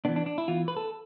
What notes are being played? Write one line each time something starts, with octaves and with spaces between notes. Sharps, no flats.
E3 B3 D4
D4
D4
E4
E3 B3 F4
B4
A4